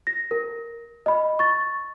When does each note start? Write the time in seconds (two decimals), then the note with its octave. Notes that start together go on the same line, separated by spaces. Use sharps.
0.07 A#6
0.31 A#4
1.06 D#5 B5
1.39 C#6 A6